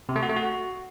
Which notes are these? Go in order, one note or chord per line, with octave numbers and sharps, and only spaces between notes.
C3
A3
F#4
A3
F#4